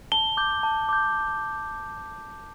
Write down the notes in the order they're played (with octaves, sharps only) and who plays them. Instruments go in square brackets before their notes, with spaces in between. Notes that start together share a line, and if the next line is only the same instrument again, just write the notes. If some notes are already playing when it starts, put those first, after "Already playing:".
[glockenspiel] A5 G7
D6 G6
A5
D6 G6